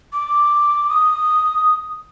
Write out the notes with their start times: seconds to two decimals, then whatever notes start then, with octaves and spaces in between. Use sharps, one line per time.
0.13 D6
0.89 D#6